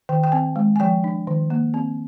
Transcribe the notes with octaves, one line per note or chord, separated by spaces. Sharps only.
D#3 G5
G5
C4 G#5
G#3
G#5
F3 G5
D4
D#3
A#3
C4